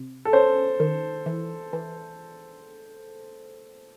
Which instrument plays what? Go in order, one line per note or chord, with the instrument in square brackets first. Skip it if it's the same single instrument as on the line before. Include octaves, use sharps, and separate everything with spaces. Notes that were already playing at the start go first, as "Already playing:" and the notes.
Already playing: [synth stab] C3
[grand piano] A4
[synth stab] C#4 [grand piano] C5
[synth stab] D#3
E3
E3